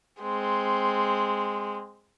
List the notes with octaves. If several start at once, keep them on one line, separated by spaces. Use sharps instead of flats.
G#3 C4